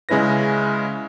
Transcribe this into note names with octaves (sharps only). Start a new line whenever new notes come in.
C#3 G#3 C#4 E4 B4 A#6